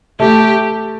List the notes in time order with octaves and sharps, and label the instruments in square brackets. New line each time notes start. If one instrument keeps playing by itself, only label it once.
[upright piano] A3 [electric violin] G4